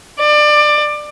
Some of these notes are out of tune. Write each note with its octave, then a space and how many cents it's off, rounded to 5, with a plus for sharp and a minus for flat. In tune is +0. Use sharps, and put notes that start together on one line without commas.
D5 +25